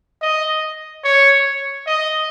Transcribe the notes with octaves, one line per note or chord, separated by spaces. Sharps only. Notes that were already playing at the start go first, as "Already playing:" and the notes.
D#5
C#5
D#5